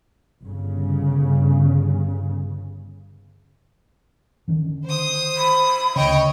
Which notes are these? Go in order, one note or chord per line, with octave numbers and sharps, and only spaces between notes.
G1 C#3
D3 D#3 C#4
C5 D#6
B5
D2 C#3 C#5 D#5 G5